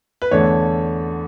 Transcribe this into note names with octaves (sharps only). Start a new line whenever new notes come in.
B4
E2 D3 A3 C#5